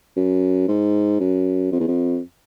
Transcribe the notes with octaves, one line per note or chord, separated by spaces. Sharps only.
F#2
G#2
F#2
F2
E2
F2